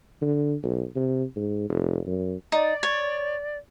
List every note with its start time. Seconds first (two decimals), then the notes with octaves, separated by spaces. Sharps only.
0.22 D3
0.63 B1
0.96 C3
1.36 G#2
1.70 F1
2.07 F#2
2.52 D#4 D5
2.83 C#5